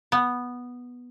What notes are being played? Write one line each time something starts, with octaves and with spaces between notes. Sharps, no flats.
B3